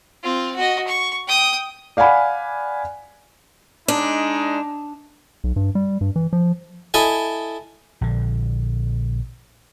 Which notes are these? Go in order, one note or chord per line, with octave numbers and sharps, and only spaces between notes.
C4 F4
F#4 D#5
C#6
G5 D#6
D5 F5 F#5 G#5 B5
G#3 D4 D#4
B1
G2
G3
G2
E3
F3
E4 A4 D#5 G#5
A#1 D3